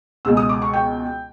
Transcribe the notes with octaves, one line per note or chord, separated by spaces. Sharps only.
C#2 B2 G#3 E6
D#6
D6
C#6
G5